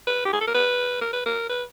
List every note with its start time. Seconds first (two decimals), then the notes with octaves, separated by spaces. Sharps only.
0.07 B4
0.25 G4
0.33 G#4
0.41 A4
0.48 A#4
0.55 B4
1.01 A#4
1.13 B4
1.26 A#4
1.49 B4